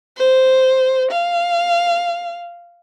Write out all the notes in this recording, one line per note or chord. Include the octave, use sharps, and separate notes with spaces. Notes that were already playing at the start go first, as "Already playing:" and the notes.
C5
F5